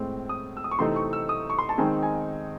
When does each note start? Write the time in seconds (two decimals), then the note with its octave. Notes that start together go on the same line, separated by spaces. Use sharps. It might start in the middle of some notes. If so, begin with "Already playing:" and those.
Already playing: A2 G#3 C4
0.29 D#6
0.57 E6
0.64 D#6
0.71 C#6
0.79 C3 E3 A3 C4 D#4 C6
0.96 C#6
1.13 E6
1.29 D#6
1.50 C#6
1.59 C6
1.69 A5
1.78 D#3 G#3 C4 D#4 G#5
2.03 G#5